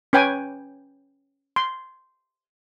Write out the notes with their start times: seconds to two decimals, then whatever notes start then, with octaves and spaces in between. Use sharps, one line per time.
0.13 C#4 B4 G5 G#5
1.56 C6